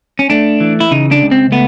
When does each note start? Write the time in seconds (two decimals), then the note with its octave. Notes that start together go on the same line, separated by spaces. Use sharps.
0.19 C#4
0.30 A3 D4
0.60 E3
0.80 E4
0.91 C#3 D#4
1.11 D4
1.22 C#2
1.31 C4
1.52 A3 B3